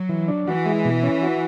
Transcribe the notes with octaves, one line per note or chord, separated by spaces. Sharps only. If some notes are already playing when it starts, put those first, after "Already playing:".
Already playing: F#3
E3
D4
E3 F#4
G#3
B2
C#4
F#4